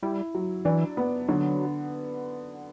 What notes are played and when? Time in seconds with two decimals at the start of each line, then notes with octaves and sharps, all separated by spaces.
0.03 G3 E4
0.35 F#3
0.65 E3 D4
0.97 B3
1.28 D3 F#3